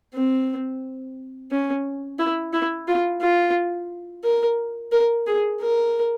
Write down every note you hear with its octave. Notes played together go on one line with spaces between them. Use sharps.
C4
C#4
E4
E4
F4
F4
A#4
A#4
G#4
A#4